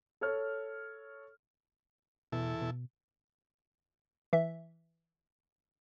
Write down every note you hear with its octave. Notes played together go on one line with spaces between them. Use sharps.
A4 C#5 F6
E2 B2 E4 A4
B2
E3 E5